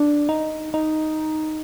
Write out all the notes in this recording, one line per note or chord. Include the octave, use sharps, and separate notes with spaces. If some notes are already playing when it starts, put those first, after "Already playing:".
Already playing: D4
D#4
D#4